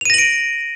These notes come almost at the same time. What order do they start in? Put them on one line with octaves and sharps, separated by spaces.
F7 D#7 A#6 F#7 D7